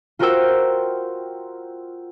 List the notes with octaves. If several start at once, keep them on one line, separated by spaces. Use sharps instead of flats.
F4 F#4 A#4 C5 G5 E6